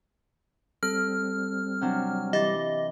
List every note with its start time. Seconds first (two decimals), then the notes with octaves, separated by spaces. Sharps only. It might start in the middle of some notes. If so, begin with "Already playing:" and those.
0.83 G3 C4 A4 F6
1.81 C3 F#3 D4
2.33 E3 G4 D#5 A6